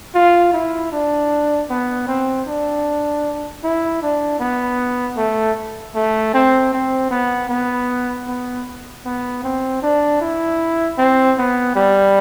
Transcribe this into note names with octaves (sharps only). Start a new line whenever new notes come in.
F4
E4
D4
B3
C4
D4
E4
D4
B3
A3
A3
C4
C4
B3
B3
B3
B3
C4
D4
E4
C4
B3
G3